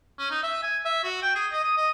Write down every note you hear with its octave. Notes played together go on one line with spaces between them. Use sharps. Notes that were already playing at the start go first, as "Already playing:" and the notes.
C#4
D#4
E5
G#5
E5
F#4
G5
G#4
D#5
D#6
D#5